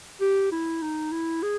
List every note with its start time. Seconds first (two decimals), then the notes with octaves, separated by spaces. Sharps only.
0.21 G4
0.52 E4
0.82 D#4
1.12 E4
1.43 G#4